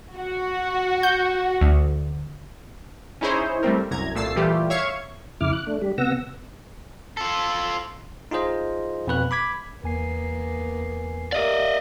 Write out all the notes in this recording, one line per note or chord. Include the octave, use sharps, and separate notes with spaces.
F#4
G6
D2
C#4 D#4 E4 G#4 C5 C#5
G3 A3 C4 A#4
C2 F#2 A#5 G#6
C2 A#2 A3 E6 A6 C7
A#2 E3 G3 A3 F4 G4
C#5 E5 F5 C#6 G#6
F2 C#3 E4 D6 F6
F#6
A3 D4
G3 G4
C3 B3 F#5 E6 A#6
F4 A4
D#4 F4 G#4 C5 D#5
F2 B2 B4 F#6
B5 D6 G#6 B6
E2 A#3 B3 G#5 C7
G4 A#4 D5 D#5 F5